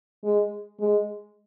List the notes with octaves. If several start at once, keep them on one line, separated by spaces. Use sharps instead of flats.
G#3
G#3